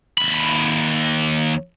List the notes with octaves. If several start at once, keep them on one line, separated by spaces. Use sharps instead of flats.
D#2 B5